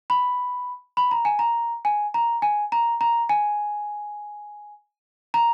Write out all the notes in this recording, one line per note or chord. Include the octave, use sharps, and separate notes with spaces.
B5
B5
A#5
G#5
A#5
G#5
A#5
G#5
A#5
A#5
G#5
A#5